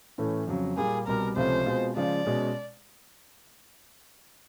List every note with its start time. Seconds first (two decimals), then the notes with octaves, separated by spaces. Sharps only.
0.18 A2 E3 A3 C#4
0.47 F2 C#3 F#3
0.77 A#2 G3 A#3 G#4
1.07 C2 B2 G3 A#4
1.36 C#2 C3 F3 A3 C#4 C5
1.66 B2 G#3 C4 F4
1.96 C#3 F3 G#3 D5
2.25 B2 G#3 C#4